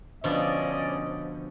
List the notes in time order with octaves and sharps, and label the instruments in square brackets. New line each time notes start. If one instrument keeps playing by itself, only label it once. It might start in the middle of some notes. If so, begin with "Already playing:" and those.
[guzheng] B2 D3 F3 [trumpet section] C#4 D5 D#5